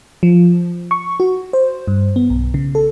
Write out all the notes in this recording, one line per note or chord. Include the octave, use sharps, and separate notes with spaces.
F3
C#6
F#4
C5
G2
B3
B1
C#3
A4